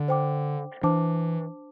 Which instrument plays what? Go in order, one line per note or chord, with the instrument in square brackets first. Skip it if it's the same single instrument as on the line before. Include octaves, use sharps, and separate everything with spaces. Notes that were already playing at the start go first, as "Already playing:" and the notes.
Already playing: [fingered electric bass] D3
[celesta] C5 G5 D6
[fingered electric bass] E3 [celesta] D4 C5 A5 D6